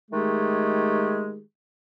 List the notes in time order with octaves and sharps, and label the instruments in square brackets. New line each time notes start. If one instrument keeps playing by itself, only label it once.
[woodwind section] D#3 G#3 A3 G4 G#4